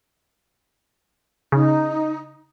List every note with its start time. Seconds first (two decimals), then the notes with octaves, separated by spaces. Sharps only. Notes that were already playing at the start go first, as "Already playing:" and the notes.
1.52 C#3 D#4